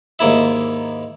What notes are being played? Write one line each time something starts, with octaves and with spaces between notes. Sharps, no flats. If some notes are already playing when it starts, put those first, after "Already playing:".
D#2 G#2 A#3 E4 E5